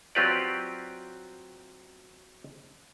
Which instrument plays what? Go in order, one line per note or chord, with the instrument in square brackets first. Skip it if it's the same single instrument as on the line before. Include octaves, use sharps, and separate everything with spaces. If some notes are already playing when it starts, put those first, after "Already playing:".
[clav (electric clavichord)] F#3 C4 F4 G4 B4 D5